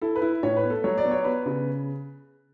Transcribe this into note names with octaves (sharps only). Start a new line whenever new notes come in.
E4 A4
B4
E4
A2 C#5
B4
B3
A4
F#3 C#5
D5
B3
C#5
B3 B4
C#3